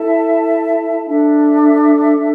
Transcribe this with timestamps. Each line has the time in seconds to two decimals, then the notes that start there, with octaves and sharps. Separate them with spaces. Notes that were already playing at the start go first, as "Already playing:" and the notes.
Already playing: E4 A4 E5 A5
1.07 D4 A4 E5